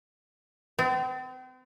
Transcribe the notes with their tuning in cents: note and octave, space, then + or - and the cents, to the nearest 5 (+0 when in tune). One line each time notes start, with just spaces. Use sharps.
C4 -40